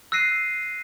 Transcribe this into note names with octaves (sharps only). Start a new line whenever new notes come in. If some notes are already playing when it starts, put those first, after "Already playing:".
E6 F#6 A#6 C7 D#7